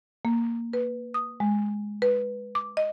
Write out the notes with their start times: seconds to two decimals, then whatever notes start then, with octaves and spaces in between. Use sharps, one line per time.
0.25 A#3
0.73 B4
1.14 D#6
1.40 G#3
2.02 B4
2.55 D6
2.77 D#5